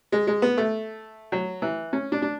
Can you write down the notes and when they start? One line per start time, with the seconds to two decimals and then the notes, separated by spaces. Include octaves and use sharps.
0.12 G#3
0.27 G#3
0.42 B3
0.58 A3
1.32 F#3
1.62 E3
1.93 C#4
2.12 D4
2.22 D4